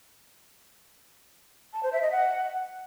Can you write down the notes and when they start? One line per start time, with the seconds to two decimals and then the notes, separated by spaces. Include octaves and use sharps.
1.73 A5
1.83 C5
1.93 E5
2.02 D#5
2.12 F#5